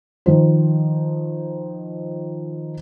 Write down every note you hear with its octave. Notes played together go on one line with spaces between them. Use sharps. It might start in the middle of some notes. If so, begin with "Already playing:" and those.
D#3 F3 C5